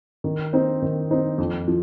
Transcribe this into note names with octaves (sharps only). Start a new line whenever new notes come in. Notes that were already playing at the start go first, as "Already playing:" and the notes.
D#3
C4 D#4 C5
D#3
C4 D#4 C5
F2
F3